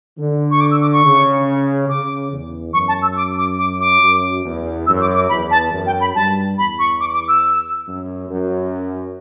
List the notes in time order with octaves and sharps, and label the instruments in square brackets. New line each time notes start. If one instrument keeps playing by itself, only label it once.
[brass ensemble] D3
[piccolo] C#6
D6
E6
D6
C#6
[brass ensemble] C#3
[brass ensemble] C#3 [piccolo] D6
[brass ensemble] E2
[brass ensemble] F#2 [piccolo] C#6
[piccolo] A5
E6
D6
D6
D6
D6
[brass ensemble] F#2
E2
[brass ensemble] F#2 [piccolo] E6
[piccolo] D6
D6
[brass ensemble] E2 [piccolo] B5
[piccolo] A5
[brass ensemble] F#2
[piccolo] G5
B5
[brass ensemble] G2 [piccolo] A5
[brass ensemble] E2 [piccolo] B5
[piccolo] C#6
D6
D6
E6
[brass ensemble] F#2
F#2